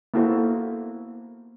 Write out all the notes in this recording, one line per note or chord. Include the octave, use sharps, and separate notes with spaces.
A#3 B3 E4 F#4 A4 C5